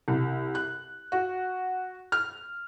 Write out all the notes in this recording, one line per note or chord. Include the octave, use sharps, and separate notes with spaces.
C2
F#6
F#4
F6